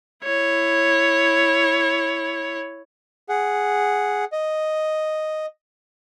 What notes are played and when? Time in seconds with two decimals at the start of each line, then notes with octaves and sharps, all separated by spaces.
0.25 E4 C#5
3.29 G#4 F#5
4.32 D#5